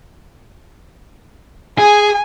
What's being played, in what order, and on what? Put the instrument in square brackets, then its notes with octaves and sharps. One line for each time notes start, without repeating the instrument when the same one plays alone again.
[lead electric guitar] G#4 [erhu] G#5